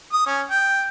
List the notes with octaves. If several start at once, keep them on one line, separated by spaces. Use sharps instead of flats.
D#6
C#4
G5